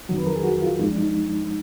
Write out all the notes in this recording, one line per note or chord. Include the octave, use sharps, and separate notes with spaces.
F2 D#3 F#3
B4
A#4
G#4
F#4
F4
F#2 F3 G#3 D#4
D4
D#4